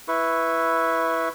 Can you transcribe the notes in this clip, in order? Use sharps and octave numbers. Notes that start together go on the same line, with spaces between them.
E4 B4 C#6